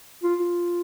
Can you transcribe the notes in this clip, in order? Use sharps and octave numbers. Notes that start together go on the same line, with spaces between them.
F4
F4